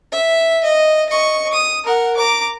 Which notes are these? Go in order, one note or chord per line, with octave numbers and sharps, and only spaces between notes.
E5
D#5
D#5 C#6
D#6
A#4 F#5
A#5 D6